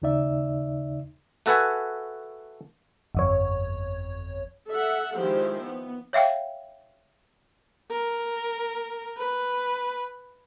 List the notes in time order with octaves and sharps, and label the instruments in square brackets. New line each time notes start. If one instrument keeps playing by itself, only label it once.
[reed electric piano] D#2 C#3 D#4 D5 E5
[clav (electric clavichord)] A3 F#4 A4 B4 F#5 G#5
[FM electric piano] G1 F2 C#5
[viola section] A4 E5 F#5
D#3 F3 G#3 E4 G4 C5
B3
[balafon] C#5 E5 F5 G5
[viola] A#4
B4